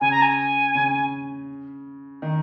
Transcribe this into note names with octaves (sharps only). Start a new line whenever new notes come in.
C#3 G#5
A#5
G#5
C#3
D#3